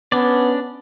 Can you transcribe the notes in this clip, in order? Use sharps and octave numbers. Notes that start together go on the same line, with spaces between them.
B3 C#4 D4 D5